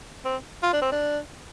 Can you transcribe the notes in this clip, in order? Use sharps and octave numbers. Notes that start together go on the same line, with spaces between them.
C4
F4
D4
C4
D4